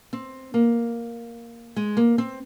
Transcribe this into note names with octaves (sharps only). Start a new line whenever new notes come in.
C4
A#3
G#3
A#3
C4